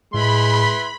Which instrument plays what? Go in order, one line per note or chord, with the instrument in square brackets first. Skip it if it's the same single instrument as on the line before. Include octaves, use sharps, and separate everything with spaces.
[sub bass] A2 [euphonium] G#3 [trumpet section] E4 B4 C6 [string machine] B5